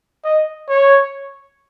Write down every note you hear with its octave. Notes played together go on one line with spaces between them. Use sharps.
D#5
C#5